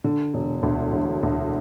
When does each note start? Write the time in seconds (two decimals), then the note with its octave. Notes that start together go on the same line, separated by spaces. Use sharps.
0.04 D3
0.34 E1
0.63 D2
0.92 E1
1.23 D2